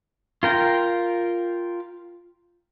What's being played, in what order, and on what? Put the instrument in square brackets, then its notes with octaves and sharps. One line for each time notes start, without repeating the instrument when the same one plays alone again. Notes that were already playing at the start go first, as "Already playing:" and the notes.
[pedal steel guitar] F4 A#4 G5